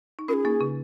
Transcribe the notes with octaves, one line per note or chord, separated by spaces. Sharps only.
D#4
C#4 F4 A#4
G#4
A#3 D#4
C#3